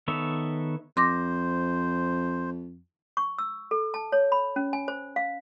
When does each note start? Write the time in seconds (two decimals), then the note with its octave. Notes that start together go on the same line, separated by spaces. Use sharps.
0.08 D#3 B3 A4 C#5 E5
0.97 F2 C5 C6 D6 A#6
3.17 C#6
3.38 E6
3.71 A4
3.94 A5
4.12 C#5
4.32 B5
4.56 C#4
4.73 G#5
4.88 C5
5.16 F5